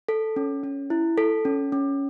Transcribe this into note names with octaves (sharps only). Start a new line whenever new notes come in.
A4
C#4
C#4
E4
A4
C#4
C#4